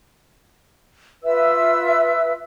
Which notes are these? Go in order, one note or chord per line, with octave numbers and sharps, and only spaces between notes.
F4 B4 E5 E6